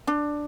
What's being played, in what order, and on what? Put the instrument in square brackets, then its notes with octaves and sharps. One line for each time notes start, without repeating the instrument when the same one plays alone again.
[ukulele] D4